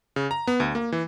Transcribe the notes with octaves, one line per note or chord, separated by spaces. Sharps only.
C#3
A#5
B3
D2
A#3
E3